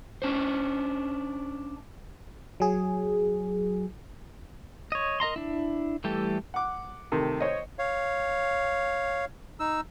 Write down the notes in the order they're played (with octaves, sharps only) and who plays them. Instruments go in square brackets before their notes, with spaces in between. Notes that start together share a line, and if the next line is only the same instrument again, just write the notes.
[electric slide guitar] C#4 D4 C5
[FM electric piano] F#3 G#4
[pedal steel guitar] C#5 D#5
A#4 D#5 A#5 C6
D4 E4
E3 G3 A3 G4 A4
[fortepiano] F#5 D6
C3 D#3 A3
C5 C#5 D#5
[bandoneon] C#5 F5
D#4 E6